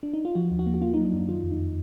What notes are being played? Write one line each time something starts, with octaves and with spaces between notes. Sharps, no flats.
D4
D#4
F4
F3 F#4
D#2
F#4
A#3
F#4
A#3 F4
D#4
F#3
D4
F#2 D#4
D#3 F4
F2
D#4